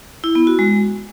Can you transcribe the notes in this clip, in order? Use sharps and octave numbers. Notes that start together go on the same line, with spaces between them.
E4
B3
F#4
G#3